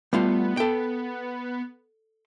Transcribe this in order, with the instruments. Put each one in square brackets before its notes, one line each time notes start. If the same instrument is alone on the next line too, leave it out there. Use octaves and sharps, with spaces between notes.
[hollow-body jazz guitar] G3 A3 F4 [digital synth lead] B3
[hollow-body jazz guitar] A4 G5